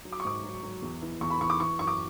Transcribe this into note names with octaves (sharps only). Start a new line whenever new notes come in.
F#3
D6
C#6
G#2 D6
F#3
F#3
E2
E3
E2 C#6
B5
E2 C#6
D6
E3 C#6
F#2 C#6
D6